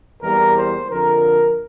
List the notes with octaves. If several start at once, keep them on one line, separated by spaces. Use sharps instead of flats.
E2 E3 G3 A#3 A#4
C5
F2 D3 F3 A#4